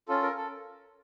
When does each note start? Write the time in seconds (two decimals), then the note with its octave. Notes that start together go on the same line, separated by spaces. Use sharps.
0.08 C#4 F4 A4
0.22 A#4
0.37 A4